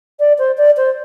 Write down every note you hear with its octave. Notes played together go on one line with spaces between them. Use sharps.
D5
C5
D5
C5